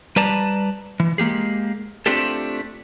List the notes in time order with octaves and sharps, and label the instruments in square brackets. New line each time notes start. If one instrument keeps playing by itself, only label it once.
[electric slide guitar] G3 B4 D5 A5 A#5
E3
G#3 A#3 G4 G#4
A3 C4 D4 F4 G4 A4